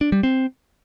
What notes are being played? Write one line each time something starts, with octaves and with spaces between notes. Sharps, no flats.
D4
G3
C4